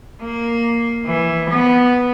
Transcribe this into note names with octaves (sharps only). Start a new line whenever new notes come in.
A#3
E3
B3